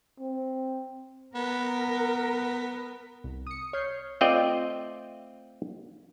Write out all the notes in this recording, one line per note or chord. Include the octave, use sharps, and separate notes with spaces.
C4
B3 A#4
C2
D#6 C#7
C#5 F6 G6 C7
A3 C4 F4 D5 D#5 G5